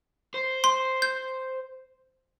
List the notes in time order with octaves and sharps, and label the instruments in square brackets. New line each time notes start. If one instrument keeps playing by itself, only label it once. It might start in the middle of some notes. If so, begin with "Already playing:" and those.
[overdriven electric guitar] C5
[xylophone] C6
G6